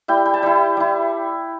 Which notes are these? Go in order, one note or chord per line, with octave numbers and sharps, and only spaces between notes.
G3 E4 G5
G5
A5
G3 E4 G5
G3 E4